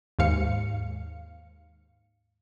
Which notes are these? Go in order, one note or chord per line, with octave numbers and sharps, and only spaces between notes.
D#2 G#2 F5 C#7